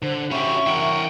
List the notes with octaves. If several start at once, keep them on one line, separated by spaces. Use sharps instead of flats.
D3 C5
C#4 E4 F#4 G4 E5 C#6
E3 A#4 F#5 G5